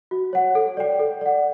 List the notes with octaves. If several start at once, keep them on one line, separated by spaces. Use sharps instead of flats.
F#4
C#5 F#5
A4
D5 G5
A4
D5 F#5